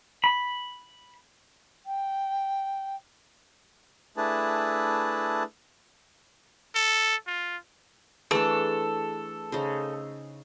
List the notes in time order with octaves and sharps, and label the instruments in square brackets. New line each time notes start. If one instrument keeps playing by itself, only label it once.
[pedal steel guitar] B5
[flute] G5
[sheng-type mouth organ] A3 D4 E4 G#4 B4 A5
[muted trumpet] A4
F4
[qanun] E3 A3 D4 [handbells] G#4 [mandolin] A4
[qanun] C#3 D#4 C5